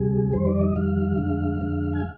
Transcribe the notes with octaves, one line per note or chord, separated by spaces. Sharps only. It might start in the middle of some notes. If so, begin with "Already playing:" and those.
Already playing: D2 C3 G3 G#4
F2 D#3 G3 C5
D5
D#5
F2 D#3 G3 F5
F2 D3 G#3
F2 D3 G#3
G#5